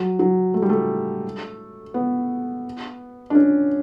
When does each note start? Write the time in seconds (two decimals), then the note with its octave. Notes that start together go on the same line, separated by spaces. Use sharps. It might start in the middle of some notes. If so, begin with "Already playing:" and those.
Already playing: F#3
0.19 F#3
0.54 A3
0.62 G3
0.70 A3
1.94 B3
3.30 D4
3.35 C#4